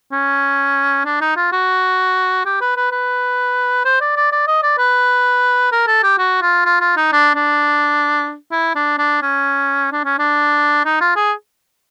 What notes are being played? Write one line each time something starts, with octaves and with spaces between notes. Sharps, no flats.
C#4
D4
D#4
F4
F#4
G4
B4
B4
B4
C5
D5
D5
D5
D#5
D5
B4
A#4
A4
G4
F#4
F4
F4
F4
D#4
D4
D4
E4
D4
D4
C#4
D4
C#4
D4
D#4
F4
G#4